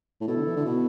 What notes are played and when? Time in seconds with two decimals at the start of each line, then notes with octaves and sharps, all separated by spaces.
0.21 A2
0.27 B2 E4 A4
0.36 D3
0.46 E3
0.56 D3
0.65 B2 B3 E4